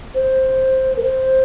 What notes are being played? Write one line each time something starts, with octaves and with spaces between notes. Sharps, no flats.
C5
A#4
C5